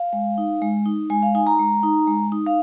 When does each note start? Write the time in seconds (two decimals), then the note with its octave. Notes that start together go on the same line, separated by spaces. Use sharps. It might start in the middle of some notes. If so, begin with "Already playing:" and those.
Already playing: F5
0.13 G#3
0.38 D#4
0.62 G#3
0.86 D#4
1.10 G#3 G#5
1.22 F5
1.35 D#4 G#5
1.47 A#5
1.59 G#3
1.83 D#4
2.07 G#3
2.32 D#4
2.47 F5